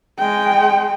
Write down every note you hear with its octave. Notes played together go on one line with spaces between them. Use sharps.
G#3 G5